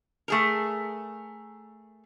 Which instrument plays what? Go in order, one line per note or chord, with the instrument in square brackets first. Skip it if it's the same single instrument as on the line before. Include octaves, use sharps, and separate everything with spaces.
[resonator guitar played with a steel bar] A3 G#4 A#4